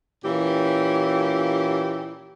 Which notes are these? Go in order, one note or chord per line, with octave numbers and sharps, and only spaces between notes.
A#2 E3 C#4 G4